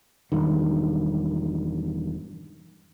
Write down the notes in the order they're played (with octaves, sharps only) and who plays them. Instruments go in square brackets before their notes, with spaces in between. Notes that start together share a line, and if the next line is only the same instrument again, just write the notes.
[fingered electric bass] E1 A#1 G2 D#3